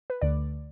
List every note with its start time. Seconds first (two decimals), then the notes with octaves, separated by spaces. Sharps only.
0.10 B4
0.21 D2 D3 A3 D5